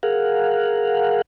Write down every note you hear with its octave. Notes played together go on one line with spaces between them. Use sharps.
G#4 A#4 F5 F#5